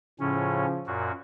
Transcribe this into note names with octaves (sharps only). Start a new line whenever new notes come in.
A2 C#3 F3 C#4
F#2 A#2 F#4